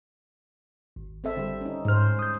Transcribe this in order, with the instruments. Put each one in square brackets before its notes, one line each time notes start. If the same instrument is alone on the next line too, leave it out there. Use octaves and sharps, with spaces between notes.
[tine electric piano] G#1
[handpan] C4 A4 E5
D3 G3 A4
C#4 D#4
[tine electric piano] G#2 F6 [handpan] G#3 C5
[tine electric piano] D#6 G6